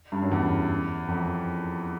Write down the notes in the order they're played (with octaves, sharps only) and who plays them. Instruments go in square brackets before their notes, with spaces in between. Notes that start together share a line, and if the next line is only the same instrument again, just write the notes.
[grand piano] G2
F#2
E2
F2